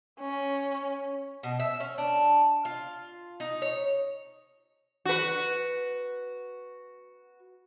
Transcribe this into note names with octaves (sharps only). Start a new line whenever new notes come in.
C#4
B2
E5
C#4
D4
F4
D#4
C#5
F#4 B4